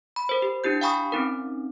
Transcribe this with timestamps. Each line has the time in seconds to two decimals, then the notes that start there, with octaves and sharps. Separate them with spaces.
0.16 B5
0.29 A#4 C5
0.42 G4
0.64 D4 E4 G4 G6
0.81 F5 G5 G#5 B5 C#6 D#6
1.12 C4 C#4 D#4 A#4